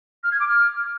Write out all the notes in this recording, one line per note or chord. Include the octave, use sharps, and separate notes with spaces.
F6
G#6
D6
F6